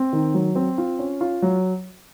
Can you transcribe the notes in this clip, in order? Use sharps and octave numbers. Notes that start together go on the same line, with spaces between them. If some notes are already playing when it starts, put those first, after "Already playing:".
Already playing: C4
D#3
F#3
C4
F4
C#4
F4
F#3